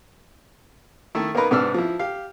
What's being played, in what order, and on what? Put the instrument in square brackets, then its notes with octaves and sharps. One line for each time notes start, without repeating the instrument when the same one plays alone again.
[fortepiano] D#3 A3 E4
A#3 B3 D#4 A#4 B4
G#2 C3 B3 D4 E6 F6
F3 E4
G4 F5